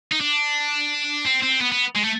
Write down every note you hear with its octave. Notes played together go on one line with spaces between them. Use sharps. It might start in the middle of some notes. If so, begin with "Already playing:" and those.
D#4
D4
C4
C4
B3
B3
G#3
A3